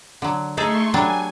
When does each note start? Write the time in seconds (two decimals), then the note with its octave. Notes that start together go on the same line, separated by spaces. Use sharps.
0.22 D3 F#3
0.57 A3 D#4 G#4 A4 C6 C#6
0.94 F#3 G3 D4 G#5